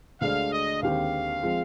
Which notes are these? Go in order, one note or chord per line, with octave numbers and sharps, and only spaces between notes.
D2 D3 G#3 D4 F5
D#5
D#2 D3 G#3 C4 G4 F5
F3 G#3 C4